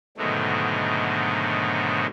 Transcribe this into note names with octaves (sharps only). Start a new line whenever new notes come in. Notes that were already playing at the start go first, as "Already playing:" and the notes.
G#2 B2 D3 D#3 F#3 A3